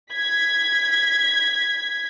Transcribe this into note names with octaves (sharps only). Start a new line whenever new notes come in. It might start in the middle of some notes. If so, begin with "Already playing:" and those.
G#6 B6